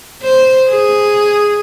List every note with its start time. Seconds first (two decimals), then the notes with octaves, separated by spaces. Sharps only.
0.23 C5
0.70 G#4